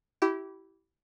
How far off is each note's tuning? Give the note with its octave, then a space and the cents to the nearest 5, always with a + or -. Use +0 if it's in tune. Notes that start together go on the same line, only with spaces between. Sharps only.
E4 +0 G4 -25